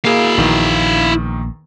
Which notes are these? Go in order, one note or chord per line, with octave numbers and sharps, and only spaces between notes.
A#3 E4 G#4 F5
A#1 E2 D#3 A#3